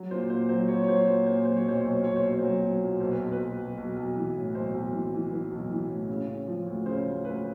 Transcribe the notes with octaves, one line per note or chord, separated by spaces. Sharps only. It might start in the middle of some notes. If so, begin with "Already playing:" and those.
Already playing: F#3
A#2 C5
A#2 C5
F#3 C5
F#3 C#5
C#5
F#3 C5
A#2 C5
A#2 C5
F#3 C5
C#5
B1 C5
B1 C#5
C5
B1 C#5
C5
B1
C#5
F#3 C5
B1
A#2
B1 C5
B4
B1
B4
B1
B1
B1
B1
E3
A2
B1 C5
B1
E3
E3
E3 B4
B1
E3
A2
C#3
C#3
F3
D2
C#3 C5
D2
D2 B4